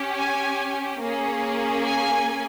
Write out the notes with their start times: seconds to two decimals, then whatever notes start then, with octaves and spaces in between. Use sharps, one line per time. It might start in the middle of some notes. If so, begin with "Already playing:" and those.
Already playing: C#4 G4
0.15 G#5
0.99 A#3 C#4 G#4
1.83 G#5